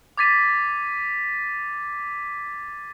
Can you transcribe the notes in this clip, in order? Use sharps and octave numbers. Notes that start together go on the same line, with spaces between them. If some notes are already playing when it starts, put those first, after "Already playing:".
D6 G#6 A6 B6 D#7